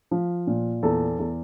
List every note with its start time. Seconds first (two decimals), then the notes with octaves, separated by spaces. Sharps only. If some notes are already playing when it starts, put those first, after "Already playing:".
0.11 F3
0.47 A#2
0.83 E2 A4
1.19 E2